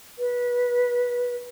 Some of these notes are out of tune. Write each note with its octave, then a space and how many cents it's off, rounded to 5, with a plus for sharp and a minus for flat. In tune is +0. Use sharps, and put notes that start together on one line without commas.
B4 -20